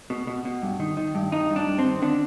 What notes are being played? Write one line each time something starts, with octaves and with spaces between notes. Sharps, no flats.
B2
B2
B2
G2
D#3
D#3
G2
G2 D#4
G2
D4
G2
C4
D#3
D3 D4